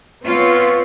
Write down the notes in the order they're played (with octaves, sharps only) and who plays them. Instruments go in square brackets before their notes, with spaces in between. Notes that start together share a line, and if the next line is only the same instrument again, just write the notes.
[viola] B3 C4 [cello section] F4 C#5